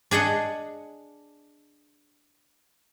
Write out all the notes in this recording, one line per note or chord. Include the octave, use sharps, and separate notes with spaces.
D4 G#4 D#5 F#5